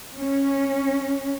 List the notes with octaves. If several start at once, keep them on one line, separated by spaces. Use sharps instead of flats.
C#4